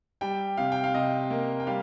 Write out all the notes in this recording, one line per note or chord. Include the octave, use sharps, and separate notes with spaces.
G3 G5
C3 F5
G5
F5
C3 D#5
A#3
G5
G3 F5